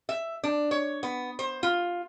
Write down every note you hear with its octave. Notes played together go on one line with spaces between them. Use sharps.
E5
D4
C#5
B3
C5
F4